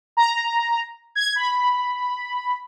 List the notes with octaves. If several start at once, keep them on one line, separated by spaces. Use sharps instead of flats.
A#5
G#6
B5